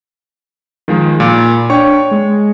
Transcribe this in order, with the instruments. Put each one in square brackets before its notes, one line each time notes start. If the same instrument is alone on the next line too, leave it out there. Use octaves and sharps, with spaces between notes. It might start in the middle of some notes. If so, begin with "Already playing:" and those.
[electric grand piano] D#3 F3 G#3
[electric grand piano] A#2 [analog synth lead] B5
[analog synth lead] D4 [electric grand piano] C#5 G5 C#6
[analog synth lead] G#3